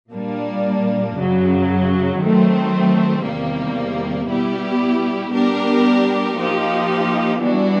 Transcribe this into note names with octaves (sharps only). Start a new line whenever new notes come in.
A#2 G3 A#3 D4
F#2 C#3 F#3
D#3 F#3 A3 C4
E2 C3 D#3 G3 A#3
B2 G3 B3 E4 G4
G3 B3 D4 G4 A#4
F3 A#3 D#4 G4
E3 G3 B3 D4 F#4